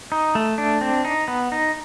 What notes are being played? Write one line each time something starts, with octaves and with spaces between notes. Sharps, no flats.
D#4
A3
D4
C4
D#4
B3
D#4